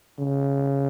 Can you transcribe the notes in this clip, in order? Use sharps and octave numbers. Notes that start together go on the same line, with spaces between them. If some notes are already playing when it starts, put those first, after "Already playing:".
C#3